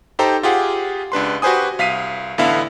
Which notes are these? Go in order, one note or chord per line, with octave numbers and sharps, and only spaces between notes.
D#4 G4 A4 C5 G5 A#5
F4 G4 G#4 F#5
C#2 D4 B4 C6
F#4 G4 B4 C5 G#5 D#6
C2 F5 B6 C7 D#7
A1 D3 B3 E4 E5 F5